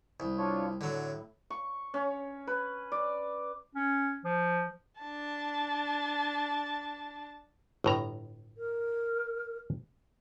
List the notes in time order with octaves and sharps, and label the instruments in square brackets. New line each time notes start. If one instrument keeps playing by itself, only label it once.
[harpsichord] C2
[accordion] D4 F4 C#5
[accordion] A2 [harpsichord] D3 F#3
[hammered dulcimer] C#6
C#4
B4
D5
[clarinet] C#4
F3
[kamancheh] D4 A5
[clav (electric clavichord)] G1 A2 A#5
[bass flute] A#4